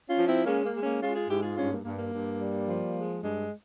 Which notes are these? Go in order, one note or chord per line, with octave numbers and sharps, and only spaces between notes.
C#4 F4
F3
C4 E4
G#3 A#3 C#4
A#3
G#3
A#3 C#4
G#3 C#4 F4
F4 G#4
G#2 E4 G4
F4 G#4
G2 C#4 F4
A#3
G2 A#3
A#3
G2
G3
F3
G#3
G2 G#3